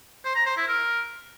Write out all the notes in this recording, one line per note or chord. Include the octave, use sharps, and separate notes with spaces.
C5
A#5
C5
E4
A#4